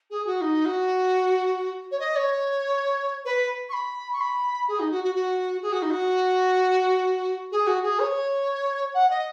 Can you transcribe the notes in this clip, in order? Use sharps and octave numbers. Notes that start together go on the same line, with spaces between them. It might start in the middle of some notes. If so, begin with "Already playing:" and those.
G#4
F#4
D#4
F#4
C#5
D#5
C#5
B4
C#6
B5
C#6
B5
G#4
D#4
F#4
F#4
F#4
G#4
F#4
D#4
F#4
G#4
F#4
G#4
C#5
F#5
D#5